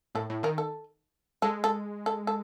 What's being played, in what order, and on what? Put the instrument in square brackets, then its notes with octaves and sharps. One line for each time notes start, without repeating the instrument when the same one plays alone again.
[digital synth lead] A2 [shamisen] A4
[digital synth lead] A2
[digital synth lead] D#3 [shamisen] A#4
[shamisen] A4
[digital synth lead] G#3 [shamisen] A4
[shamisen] A4
A4
A4